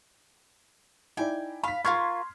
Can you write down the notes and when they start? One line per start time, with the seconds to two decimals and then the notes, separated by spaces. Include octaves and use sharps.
1.17 D#4 E4 D5 G5 G#5
1.63 F5 B5 B6
1.85 F4 A#4 C6 C#6 F6 G#6